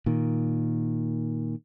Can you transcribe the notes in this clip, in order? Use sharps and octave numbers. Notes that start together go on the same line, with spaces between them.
A#2 D#3